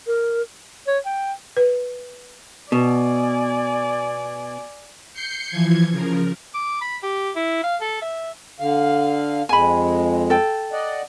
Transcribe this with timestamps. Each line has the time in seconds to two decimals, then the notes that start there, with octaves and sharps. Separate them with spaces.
0.07 A#4
0.87 C#5
1.06 G5
1.57 B4
2.72 B2 D5 G#5
5.14 G6 C7 C#7
5.49 E3 F3 G#6
5.92 C#3 F3 A#4
6.54 D6
6.81 B5
7.03 G4
7.36 E4
7.63 F5
7.81 A4
8.02 E5
8.60 D3 F5
9.49 F2 G#3 G#5 B5
10.30 A4 G5
10.72 D5 D#5 F#5